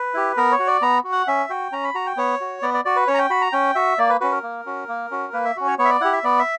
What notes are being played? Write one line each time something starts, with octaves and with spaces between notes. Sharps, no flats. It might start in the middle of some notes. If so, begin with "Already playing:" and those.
Already playing: B4
E4 G4
B3 A#4
C#5
F#4
D5
B3 A#5
F#4
F#5
C#4 E5
F#4 G5
C#4 A#5
B5
F#4 A#5
G5
B3 C#5
F#4
B3 D5
D5
F#4 D5
B4
C#4 C#5
A#5
G5
F#4 B5
A#5
C#4 G5
F#4 E5
A#3 D5
B4
C#4 F#4 B4
A#4
A#3
C#4 F#4
A#3
C#4 F#4
A#3 B4
E5
C#4 F#4
C#5
B3 C#5
E5
D5
E4 G4 F#5
E5
B3 D5
E5